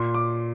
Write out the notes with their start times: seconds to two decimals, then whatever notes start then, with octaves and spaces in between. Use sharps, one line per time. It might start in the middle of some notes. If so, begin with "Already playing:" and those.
Already playing: A#2 C6
0.14 D6